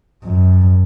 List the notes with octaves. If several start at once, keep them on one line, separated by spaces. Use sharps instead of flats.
F#2